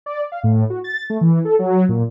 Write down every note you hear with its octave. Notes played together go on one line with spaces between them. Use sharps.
D5
F5
A2
F#4
A6
A3
E3
A4
F#3
A#2